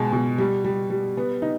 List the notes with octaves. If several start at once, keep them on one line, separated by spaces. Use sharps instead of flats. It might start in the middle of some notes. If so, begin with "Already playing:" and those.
Already playing: B2 G#3
B2
G3
G3
G3
B3
D#4